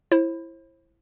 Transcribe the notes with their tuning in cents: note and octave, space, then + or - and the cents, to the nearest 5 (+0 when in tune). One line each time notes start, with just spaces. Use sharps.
E4 +10 C5 +35